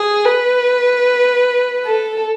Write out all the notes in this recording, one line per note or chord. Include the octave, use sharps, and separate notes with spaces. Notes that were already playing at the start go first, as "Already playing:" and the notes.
Already playing: G#4
B4
A4